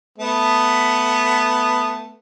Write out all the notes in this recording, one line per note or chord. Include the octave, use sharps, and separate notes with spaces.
A3 B3